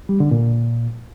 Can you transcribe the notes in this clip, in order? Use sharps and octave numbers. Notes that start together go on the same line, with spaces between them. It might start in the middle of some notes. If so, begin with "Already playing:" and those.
G3
D3
A#2